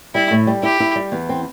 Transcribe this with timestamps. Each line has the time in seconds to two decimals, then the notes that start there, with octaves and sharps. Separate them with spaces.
0.14 G3 E4
0.31 A2
0.47 G3
0.63 E4 G4
0.80 E4
0.96 G3
1.12 E2
1.29 C4